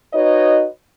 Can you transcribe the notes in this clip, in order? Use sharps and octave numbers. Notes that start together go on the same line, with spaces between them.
D#4 F#4 B4 C#5 D#5